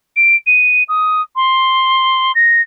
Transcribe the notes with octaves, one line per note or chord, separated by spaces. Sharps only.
D7
D#7
D#6
C6
A#6